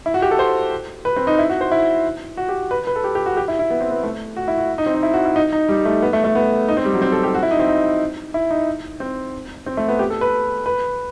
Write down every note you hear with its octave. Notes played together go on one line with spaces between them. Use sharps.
E4
F#4
G4
A4
C5
B4
C4
D#4
E4
F#4
C5
E4
F#4
G4
B4
B4
A4
G4
G4
F#4
G4
E4
E4
B3
C4
B3
A3
F#4
E4
F#4
D#4
C4
D#4
E4
F#4
E4
D#4
D#4
G3
A3
B3
A3
A3
B3
D#4
C4
G3
F#3
C4
A4
G4
F#4
E4
D#4
C4
D#4
E4
D#4
C4
C4
A3
B3
G4
A4
B4
B4